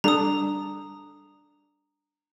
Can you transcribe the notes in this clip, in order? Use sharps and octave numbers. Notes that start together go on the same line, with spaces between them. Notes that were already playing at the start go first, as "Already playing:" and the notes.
G3 D4 A4 A#5 D#6